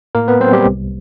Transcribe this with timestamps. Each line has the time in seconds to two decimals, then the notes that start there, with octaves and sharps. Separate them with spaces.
0.15 A2 A#3 A#4
0.28 B3 B4
0.40 F#3 C4 C5
0.52 G3 G4
0.66 C2